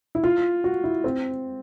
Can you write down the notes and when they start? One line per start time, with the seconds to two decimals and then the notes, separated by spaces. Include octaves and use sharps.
0.15 E4
0.24 F4
0.64 F#4
0.84 E4
1.04 C4